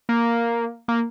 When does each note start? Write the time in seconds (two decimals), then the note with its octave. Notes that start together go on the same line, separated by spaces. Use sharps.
0.09 A#3
0.88 A#3